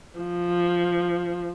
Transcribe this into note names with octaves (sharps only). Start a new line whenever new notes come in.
F3